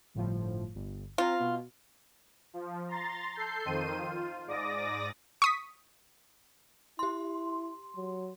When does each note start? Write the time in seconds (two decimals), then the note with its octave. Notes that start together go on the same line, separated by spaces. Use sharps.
0.14 G1 A2 F3
0.75 G1
1.18 C4 F4 A#5
1.39 B2
2.54 F3
2.88 A#5 C6 A6
3.35 A4 G6 C7
3.65 F2 D#3 C5 D#7
3.98 F4
4.47 G#2 D5 D6 D#6 A#6
5.42 C#6 D#6 B6
6.99 E4 G4 C6
7.96 F#3